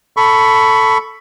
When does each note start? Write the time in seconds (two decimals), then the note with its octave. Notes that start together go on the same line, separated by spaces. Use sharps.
0.17 A4 B5 C#6